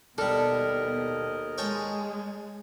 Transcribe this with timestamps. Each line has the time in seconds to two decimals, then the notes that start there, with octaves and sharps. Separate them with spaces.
0.18 D#2 B2 G3 D4 A4 A#4 D#5
1.58 G#3 C#5 G5 A5